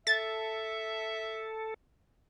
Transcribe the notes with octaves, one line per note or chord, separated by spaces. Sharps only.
A4 E5 A6